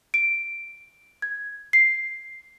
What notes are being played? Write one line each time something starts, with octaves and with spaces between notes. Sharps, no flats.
D7
G#6
C7